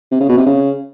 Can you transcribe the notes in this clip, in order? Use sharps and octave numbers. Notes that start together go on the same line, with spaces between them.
C3
C#3
B2
C3
C#3